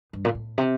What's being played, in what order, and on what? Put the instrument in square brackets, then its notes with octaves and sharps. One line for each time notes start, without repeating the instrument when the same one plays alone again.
[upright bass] G2
A#2
A2
C3